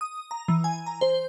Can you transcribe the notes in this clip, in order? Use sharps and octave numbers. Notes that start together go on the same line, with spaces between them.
D#6
A#5
E3
G#5
A#5
C5